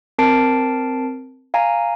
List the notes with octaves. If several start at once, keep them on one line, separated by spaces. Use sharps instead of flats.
C4 A#4 A5 C7 D7
F5 G#5 A#5